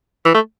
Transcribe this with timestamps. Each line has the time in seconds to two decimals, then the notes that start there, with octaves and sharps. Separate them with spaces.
0.25 E3
0.35 A3